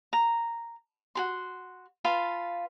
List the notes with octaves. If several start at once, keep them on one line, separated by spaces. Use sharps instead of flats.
A#5
F#4 G#4 C6
F4 B4 F5 A5